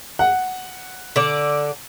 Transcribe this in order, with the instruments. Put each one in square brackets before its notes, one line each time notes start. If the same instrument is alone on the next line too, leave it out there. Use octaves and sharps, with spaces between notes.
[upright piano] F#5
[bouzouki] D3 D5